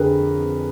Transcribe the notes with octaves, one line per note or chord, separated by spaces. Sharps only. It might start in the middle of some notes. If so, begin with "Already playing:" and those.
Already playing: F2 D3 G#4 A#4 B4